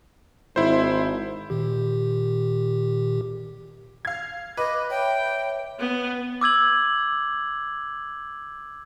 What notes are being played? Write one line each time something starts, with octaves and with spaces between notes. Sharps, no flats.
G#1 E4 C5
A#2 D#3 G4
F5 G#6
B4 D#5 D6
C#5 E5 G5
B3
D6 E6 G#6 F#7